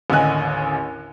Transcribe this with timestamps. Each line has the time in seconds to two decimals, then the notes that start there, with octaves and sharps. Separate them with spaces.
0.10 A1 D#2 D3 D#5 G#5 F#6